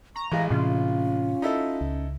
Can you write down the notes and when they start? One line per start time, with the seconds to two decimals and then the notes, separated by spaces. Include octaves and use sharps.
0.16 A#5 C#6
0.32 A1 E3 G#3 F5
0.50 A2 C3 E3 C#4 F4
1.42 D#4 E4 A4
1.81 C#2